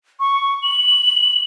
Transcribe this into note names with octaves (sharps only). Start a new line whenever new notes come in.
C#6
F#7